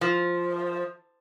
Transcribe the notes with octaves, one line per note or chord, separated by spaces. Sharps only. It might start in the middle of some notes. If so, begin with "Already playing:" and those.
F3